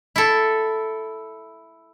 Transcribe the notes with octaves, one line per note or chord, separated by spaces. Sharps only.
E4 A4